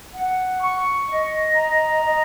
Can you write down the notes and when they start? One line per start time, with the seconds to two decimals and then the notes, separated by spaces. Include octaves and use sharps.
0.13 F#5
0.60 C#6
1.07 D#5
1.54 A#5
2.01 D#5